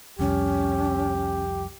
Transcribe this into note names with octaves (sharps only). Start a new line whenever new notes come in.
C2 F2 C#4 G4